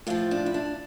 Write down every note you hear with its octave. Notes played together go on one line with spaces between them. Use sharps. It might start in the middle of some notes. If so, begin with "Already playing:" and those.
A2 F3 F4
D4
E4
D4